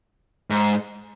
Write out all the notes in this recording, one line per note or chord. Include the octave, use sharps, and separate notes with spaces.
G#2